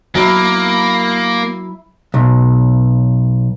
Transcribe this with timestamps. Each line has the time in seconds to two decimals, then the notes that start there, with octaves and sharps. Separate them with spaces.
0.15 F#3 A#3 E4 A#5
2.14 B1